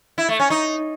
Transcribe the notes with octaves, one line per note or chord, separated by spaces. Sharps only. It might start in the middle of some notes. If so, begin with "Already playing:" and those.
E4
A3
C#4
D#4